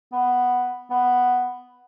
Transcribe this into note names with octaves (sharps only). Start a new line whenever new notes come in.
B3
B3